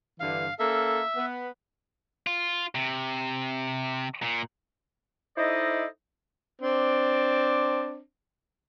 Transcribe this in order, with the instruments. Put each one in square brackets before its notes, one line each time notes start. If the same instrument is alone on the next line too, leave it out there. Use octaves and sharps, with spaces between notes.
[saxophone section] G2 D3 E3 [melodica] F5
[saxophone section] A#3 C#4 A4 [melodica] E5
[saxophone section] B3
[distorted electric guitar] F4
C3
A#2
[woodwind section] D#4 E4 A4 C5 D5 D#5
[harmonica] C4 D4